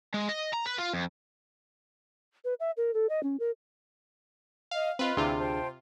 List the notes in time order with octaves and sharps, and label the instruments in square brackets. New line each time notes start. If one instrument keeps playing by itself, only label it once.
[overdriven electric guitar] G#3
D#5
A#5
B4
F4
F2
[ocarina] B4
E5
A#4
A4
D#5
C#4
A#4
[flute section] D#5 [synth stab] F5
[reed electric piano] C4 [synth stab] F4 B4 [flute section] D#5
[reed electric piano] D2 D4 G#4 [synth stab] C3 F4 [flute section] E4 E5
[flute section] C5 G5 A5